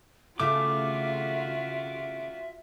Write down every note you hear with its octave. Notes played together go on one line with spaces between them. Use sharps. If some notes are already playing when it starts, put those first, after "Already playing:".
C#3 A3 F4 F#4 E5 D6